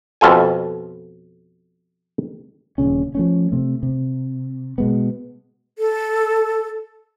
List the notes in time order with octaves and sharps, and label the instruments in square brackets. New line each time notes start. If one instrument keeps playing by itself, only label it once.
[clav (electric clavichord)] F2 B2 F4 A4 G#5
[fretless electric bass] D#1 A#2 C#3 C#4
F3 A3 C#4
C3 A3
C3
B2 G#3 B3
[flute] A4